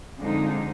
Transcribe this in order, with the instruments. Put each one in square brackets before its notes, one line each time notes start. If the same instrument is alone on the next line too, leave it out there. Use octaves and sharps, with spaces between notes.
[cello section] F2 D3 G#3 D#4